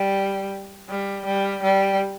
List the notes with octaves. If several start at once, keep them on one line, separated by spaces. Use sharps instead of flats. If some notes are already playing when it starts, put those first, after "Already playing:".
Already playing: G3
G3
G3
G3